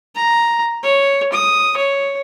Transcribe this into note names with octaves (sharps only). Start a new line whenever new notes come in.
A#5
C#5
D#6
C#5